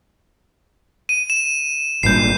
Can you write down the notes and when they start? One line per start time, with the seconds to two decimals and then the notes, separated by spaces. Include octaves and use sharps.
1.09 D#7
1.30 E7
2.03 G#1 G2 A#2 G6 C7